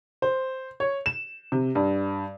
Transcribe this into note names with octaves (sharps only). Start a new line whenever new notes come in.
C5
C#5
E7
C3
G2